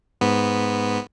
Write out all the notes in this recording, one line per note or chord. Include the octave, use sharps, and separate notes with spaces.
G#2 B3